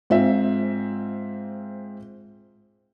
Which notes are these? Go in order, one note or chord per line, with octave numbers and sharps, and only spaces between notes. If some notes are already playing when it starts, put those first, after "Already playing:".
G#2 C4 F4 C5 E5